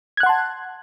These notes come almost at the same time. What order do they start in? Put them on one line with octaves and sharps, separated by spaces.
G#6 F#6 F#5 C6 A5